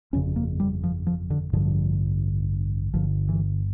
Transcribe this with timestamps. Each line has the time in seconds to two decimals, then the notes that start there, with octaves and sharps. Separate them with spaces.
0.13 G1 F2 C#3 C#4
0.36 A#3
0.60 G3
0.83 F3
1.07 F3
1.30 D3
1.53 A1 G2 D3 F3
2.93 G1 G2 D3 F3
3.29 E3